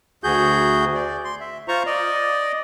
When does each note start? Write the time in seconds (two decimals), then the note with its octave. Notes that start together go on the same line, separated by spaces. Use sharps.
0.24 D2 F#4 G#4 G6
0.95 D5
1.25 C6
1.40 E5
1.68 F4 C5 A#5 C#6
1.86 D5 D#5